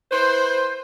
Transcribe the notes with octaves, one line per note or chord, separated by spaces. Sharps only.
E4 B4 C5